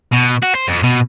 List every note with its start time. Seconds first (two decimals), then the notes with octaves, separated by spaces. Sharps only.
0.12 B2
0.42 F#4
0.55 C5
0.68 F2
0.84 B2